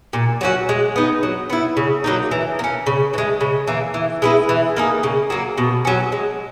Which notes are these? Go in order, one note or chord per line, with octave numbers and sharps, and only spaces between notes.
A#2
F#3 C#4 F#4
G#3
B3 D#4
F#3
B3 E4
C#3
F#3 A#3 D#4
E3
A#3
C#4
C#3
E3
G#3
C#3
E3 A#3
E3
G#3 B3 E4
E3
A#3 D#4 G#4
C#3
F#3 A#3
B2
F#3 C#4
G#3